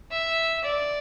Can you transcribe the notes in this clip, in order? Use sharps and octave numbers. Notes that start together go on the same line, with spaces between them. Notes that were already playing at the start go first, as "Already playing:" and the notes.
E5
D5